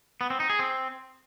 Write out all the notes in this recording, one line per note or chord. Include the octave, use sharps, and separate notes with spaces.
B3
C4
D#4
G#4
C4